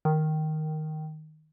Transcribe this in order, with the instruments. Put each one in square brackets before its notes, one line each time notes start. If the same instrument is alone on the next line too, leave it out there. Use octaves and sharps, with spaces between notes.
[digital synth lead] D#3